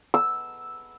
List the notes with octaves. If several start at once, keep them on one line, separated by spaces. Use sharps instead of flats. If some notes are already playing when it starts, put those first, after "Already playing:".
E6